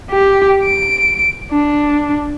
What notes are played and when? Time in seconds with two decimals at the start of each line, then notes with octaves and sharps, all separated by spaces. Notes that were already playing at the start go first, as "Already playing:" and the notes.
0.11 G4
0.65 D7
1.51 D4